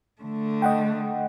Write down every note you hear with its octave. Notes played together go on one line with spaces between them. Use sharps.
D3 A3
D#5 F#5 G5